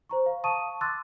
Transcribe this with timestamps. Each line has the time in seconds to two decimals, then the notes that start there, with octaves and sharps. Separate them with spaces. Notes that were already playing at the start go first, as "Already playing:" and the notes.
0.09 C5 A#5 C#6
0.26 F5
0.44 F5 A5 C#6 D#6 D#7
0.81 C6 D6 E6 F#6 A6